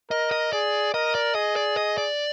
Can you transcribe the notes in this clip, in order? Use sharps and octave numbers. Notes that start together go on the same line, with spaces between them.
A#4 D#5
D#5
G#4 D5
A#4 D#5
D5
G#4 D#5
D5
D#5
D5